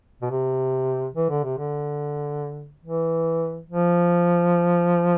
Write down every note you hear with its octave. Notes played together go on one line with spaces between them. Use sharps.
B2
C3
E3
D3
C3
D3
E3
F3